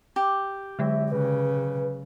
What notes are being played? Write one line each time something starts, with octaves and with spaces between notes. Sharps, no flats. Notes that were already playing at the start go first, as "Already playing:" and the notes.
G4
D3 F#3 G#3 E5
C#3 B4